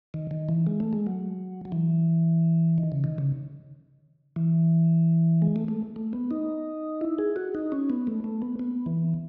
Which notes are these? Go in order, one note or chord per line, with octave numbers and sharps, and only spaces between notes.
D#3
D#3
E3
G#3
A3
G#3
F#3
F#3
E3
D#3
C#3
D#3
C#3
E3
G#3
A3
A3
A3
B3
D#4
E4
G#4
F#4
D#4
C#4
B3
A3
A3
B3
B3
E3